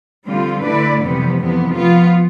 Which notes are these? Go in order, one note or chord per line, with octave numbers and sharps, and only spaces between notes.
D3 G3 C4 F4
D3 A3 E4 B4 D5
F2 C3 E3 G3 B3
F2 C3 E3 B3
F3 B3 F4